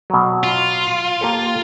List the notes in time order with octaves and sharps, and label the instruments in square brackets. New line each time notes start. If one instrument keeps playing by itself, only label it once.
[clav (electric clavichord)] B2 F#3
[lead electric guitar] F4
[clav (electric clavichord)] A#3 G4 A4